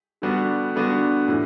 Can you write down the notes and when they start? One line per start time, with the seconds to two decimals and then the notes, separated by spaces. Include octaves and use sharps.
0.22 D3 G3 B3 D4 F#4
0.75 D3 G3 B3 D4 F#4
1.28 A2 E3